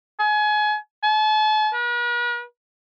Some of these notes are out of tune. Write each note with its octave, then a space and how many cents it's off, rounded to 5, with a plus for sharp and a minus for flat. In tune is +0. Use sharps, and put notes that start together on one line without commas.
G#5 +30
A5 -40
B4 -45